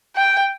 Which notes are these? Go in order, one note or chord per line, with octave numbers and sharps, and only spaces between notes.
G5